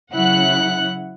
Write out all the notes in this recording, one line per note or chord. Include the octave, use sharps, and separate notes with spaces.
C#3 F#3 E4 F#5 F#6